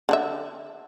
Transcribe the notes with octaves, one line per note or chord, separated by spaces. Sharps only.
D3 D4 E5